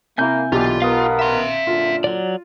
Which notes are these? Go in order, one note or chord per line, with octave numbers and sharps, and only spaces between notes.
C3 A#3 E4 G#5 G6
B1 A#2 D3 E3 F4 G4
B3 A#4 F5 D#6
E5 C6
F#2 A#2 D3 F4
F#3 D5